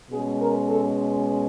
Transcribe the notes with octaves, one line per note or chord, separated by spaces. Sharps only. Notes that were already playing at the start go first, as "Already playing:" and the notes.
B2 G#3 C#4 G#4
A#4
A4